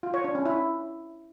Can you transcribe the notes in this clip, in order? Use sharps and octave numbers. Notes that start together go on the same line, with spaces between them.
F4
C#5
D4
C#4
E4